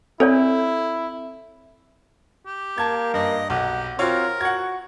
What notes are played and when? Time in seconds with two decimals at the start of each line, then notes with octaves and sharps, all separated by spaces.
0.20 C4 E4 A4 C#5 D5
2.46 G4
2.78 A#3 A5 G#6
3.14 G2 D#5
3.50 B1 G4 F#5
3.99 C4 F4 F#4 A#4 C#5
4.41 F#4 F#5 G#6